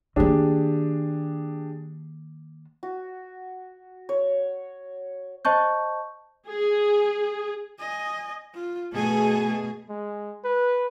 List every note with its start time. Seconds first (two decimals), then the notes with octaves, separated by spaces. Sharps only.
0.16 D#3 A#3 D4 G4 G#4
2.83 F#4
4.09 C#5
5.45 C5 D#5 A5 C#6 G6
6.48 G#4
7.79 D#5 G#5
8.55 F4
8.93 B2 A3 G#4 A4 G#5
9.89 G#3
10.44 B4